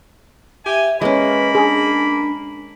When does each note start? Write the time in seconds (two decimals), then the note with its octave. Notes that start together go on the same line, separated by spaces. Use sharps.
0.65 G4 E5 G#5
1.02 G#3 A#3 C#4 B4 B5
1.55 D4 G#4